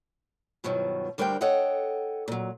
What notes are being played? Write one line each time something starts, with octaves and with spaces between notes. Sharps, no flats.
G2 B2 D#3 F3 F#3
D2 G3 D4 A#4 C5 G5
A4 C#5 D#5 F#5 G5
A#2 F#3